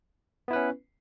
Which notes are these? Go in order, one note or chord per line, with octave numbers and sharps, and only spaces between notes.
B3 C#4 E4 B4